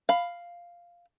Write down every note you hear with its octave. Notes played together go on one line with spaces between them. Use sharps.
F5 B5